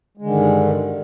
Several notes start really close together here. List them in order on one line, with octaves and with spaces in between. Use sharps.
G#3 D3 D#3 G2